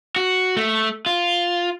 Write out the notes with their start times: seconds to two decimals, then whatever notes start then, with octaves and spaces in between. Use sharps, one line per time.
0.16 F#4
0.57 A3
1.06 F4